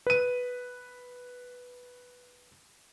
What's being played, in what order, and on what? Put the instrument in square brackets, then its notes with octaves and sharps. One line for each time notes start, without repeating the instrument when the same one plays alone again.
[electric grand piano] B4 D#7